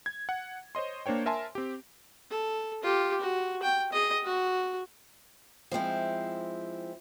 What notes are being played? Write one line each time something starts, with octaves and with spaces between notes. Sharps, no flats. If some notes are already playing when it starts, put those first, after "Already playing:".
G#6
F#5
C5 C#5 D#5 C6
A#3 D4 C5 C#5 G5
A#4 E5 G#5 A5 C6
C4 G4
A4
F4 G4
F#4
G5
G#4 D#5
F#4
F3 G#3 C4 E4